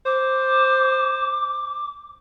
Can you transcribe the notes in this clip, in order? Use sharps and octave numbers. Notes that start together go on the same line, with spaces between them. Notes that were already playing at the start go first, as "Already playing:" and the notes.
C5 D6